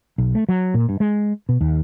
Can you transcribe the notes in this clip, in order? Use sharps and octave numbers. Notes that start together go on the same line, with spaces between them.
B1
A3
F#3
A#2
G2
G#3
B2
D#2